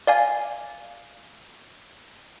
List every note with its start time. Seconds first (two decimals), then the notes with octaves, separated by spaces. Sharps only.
0.07 D5 F5 G#5